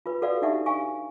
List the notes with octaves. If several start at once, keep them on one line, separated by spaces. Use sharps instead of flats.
F4 B4
F#4 A4 B4 D5 F5 F#5
D4 D#4 G4 E5 F#5
F5 G#5 C#6